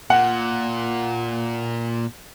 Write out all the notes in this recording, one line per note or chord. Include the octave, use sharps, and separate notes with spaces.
A#2 F#5